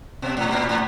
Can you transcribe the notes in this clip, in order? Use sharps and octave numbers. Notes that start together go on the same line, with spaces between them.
B2
A2
A#2
A2